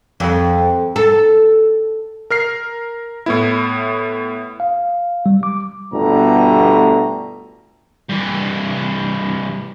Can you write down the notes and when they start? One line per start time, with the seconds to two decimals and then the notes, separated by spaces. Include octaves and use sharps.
0.20 F2
0.96 A4
2.30 A#4 F6 C7
3.26 A2 B3 E4
4.60 F5
5.26 G3
5.43 D6
5.93 G1 B2 D3 G3 A3 A#5
8.09 G2 E3